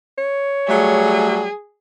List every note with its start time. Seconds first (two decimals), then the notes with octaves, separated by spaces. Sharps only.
0.18 C#5
0.68 F#3 G3 A3 G#4